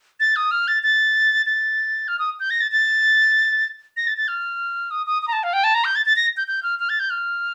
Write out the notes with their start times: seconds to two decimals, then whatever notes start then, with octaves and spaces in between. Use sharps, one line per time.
0.20 A6
0.36 D#6
0.51 F6
0.68 A6
0.83 A6
1.46 A6
2.08 F6
2.19 D#6
2.40 G6
2.50 A#6
2.61 A6
2.71 A6
3.97 A#6
4.07 A6
4.17 A6
4.28 F6
4.91 D#6
5.06 D#6
5.22 D#6
5.28 A#5
5.32 A5
5.43 F5
5.53 G5
5.64 A5
5.74 A#5
5.85 G6
5.95 A6
6.06 A6
6.16 A#6
6.37 G6
6.47 G6
6.63 F6
6.79 F6
6.89 A6
7.00 G6
7.10 F6